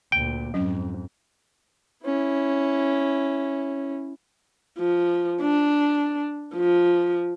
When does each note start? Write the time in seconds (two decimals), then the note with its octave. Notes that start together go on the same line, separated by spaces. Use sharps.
0.12 D2 A#2 G5
0.54 F2 G#2 F#3 C#4
2.05 C#4 E4
4.78 F3
5.41 D4
6.55 F3